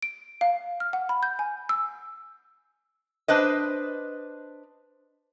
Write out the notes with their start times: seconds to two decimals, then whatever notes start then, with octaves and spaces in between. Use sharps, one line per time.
0.03 D7
0.41 F5
0.80 F6
0.93 F#5
1.09 B5
1.23 G6
1.39 G#5
1.69 E6
3.28 D4 B4 C5 D#5